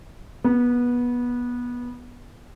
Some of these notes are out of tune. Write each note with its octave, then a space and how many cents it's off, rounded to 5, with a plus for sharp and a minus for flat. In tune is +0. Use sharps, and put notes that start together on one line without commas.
B3 -20